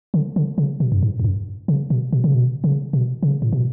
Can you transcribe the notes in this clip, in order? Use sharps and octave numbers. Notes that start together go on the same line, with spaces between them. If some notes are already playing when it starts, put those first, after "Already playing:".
D3
D3
C#3
B2
F#2
G#2
F2
F#2
C#3
B2
B2
C#3
B2
C#3
B2
C#3
A2
B2